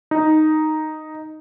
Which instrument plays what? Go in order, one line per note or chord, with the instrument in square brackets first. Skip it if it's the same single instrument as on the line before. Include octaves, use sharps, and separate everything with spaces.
[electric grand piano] D#4